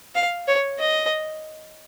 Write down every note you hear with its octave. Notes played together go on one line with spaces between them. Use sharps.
F5
C#5
D#5